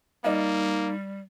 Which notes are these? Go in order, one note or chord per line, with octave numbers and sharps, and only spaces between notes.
G3 A#3 D#4 D5 D#5 F5